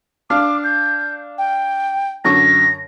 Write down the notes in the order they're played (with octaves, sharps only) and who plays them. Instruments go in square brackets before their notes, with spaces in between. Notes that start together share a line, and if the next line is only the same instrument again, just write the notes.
[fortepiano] D4 F5 F6 [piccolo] D6
[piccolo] G6
G5
[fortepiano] F#2 D3 C#6 [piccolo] A#6